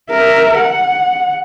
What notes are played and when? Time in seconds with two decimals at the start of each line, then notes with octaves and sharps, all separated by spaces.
0.11 A#4 E5
0.58 F#5